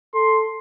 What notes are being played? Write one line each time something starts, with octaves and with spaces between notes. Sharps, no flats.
A4 C6